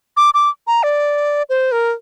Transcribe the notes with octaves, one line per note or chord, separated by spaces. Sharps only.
D6
D6
A#5
D5
C5
A#4